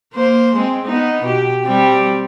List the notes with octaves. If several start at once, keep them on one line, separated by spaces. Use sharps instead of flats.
A#3 C5
G#3 C4
B3 D#4
B2 G4
G3 C4 G4